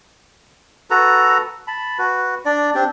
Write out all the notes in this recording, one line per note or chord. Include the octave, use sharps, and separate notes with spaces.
F#4 A4 B4 A#5
A5 B5
F#4 B4
D4 D5
C4 D4 G4